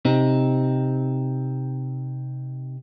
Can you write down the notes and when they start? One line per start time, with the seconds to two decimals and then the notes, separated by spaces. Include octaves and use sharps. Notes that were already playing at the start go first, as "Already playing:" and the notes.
0.05 C3 C4 D#4